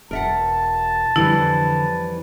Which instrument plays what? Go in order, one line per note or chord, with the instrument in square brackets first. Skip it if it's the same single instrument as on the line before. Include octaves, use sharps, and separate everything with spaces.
[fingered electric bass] E1 [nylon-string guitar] A#4 E5 F#5 [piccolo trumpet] A5
[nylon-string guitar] F2 E3 G3 [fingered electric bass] D3 [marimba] E4